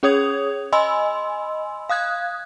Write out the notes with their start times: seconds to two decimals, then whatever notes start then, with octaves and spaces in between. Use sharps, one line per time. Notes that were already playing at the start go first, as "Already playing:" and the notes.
0.03 C#4 G#4 C#5 D#6 G#6 F7
0.72 D#5 G#5 B5 C6 E6
1.89 F5 D#6 F#6 G#6